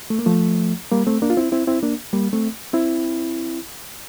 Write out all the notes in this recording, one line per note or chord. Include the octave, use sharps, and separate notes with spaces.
A3
A#3
F3 A3
G3 A#3
A3 C4
A#3 D4
F4
C4 E4
C4 E4
C4 E4
A#3 D4
G3 A#3
A3 C4
C4 E4